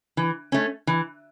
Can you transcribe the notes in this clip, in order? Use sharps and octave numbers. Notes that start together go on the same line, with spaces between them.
E3
A3 C#4
E3